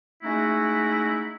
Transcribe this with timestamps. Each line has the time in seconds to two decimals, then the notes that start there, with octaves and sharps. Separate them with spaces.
0.23 G#3 A3 C#4 D#4 E4 F#4